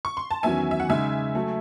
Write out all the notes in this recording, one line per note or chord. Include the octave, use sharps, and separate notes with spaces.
C#6
C6
A5
E2 D#3 F#3 C#4 E5 G#5
E5
F#5
C#3 G#3 D#4 E5 G#5
F#3 A3